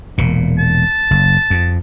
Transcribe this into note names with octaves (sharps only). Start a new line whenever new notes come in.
E1 A#2
A5
F#1
F2